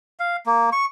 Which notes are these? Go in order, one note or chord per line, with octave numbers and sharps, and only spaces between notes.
F5
A#3
C#6